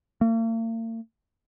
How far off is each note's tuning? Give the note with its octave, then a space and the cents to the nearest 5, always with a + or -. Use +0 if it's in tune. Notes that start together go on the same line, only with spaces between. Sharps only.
A#3 -45